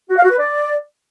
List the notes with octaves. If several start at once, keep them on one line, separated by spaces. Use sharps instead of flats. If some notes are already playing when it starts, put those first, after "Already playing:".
F#4
F5
F#4
B4
D5